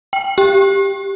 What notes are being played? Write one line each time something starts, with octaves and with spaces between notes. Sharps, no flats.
G5
G4